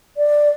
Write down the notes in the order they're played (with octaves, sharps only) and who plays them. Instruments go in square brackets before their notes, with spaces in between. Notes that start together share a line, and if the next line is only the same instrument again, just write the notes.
[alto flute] D5